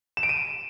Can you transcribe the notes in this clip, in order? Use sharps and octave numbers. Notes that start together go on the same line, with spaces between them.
E7
D7
D#7